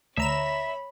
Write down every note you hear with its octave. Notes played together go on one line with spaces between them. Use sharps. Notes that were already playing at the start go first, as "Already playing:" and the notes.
D2 C#5 E5 A#5 B5 E7